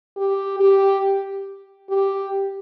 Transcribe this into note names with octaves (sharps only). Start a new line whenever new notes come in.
G4
G4
G4